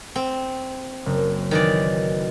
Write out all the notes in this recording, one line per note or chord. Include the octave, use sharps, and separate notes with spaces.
C4
F#1
D#3 E3 D5